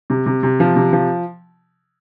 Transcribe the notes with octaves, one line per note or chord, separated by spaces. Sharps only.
C3
C3
C3
F3
C3
F3